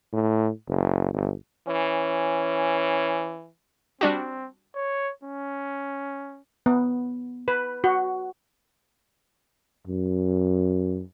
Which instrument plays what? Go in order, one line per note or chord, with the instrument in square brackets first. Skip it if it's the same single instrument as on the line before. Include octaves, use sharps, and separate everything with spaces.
[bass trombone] A2
F#1
G1
[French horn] E3 [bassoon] C#4
[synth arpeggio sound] G3 D4 F#4 [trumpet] C4
[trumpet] C#5
C#4
[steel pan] B3
B4
F#4
[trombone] F#2